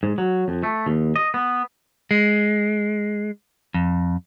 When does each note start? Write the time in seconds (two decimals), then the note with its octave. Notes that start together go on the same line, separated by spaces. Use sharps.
0.03 G#2
0.18 F#3
0.48 F2
0.63 A3
0.86 D#2
1.16 D#5
1.34 B3
2.11 G#3
3.74 F2